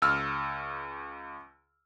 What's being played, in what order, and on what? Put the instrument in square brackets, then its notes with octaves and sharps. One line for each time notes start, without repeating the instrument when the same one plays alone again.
[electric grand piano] C#2 E6 F6